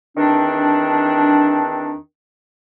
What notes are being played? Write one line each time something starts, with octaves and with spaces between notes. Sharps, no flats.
E2 D#3 C4 D4